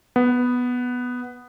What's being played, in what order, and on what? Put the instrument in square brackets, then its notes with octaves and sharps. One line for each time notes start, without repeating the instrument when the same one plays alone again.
[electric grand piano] B3